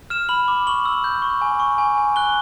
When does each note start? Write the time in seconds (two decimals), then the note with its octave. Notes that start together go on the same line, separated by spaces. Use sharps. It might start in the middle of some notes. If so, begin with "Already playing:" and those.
0.10 F6 E7
0.29 B5 F#7
0.48 D6
0.67 C#6 F#7
0.85 E6
1.04 G6
1.22 C#6
1.41 G#5
1.60 C#6
1.78 G#5
1.98 G#5
2.16 F#6 G7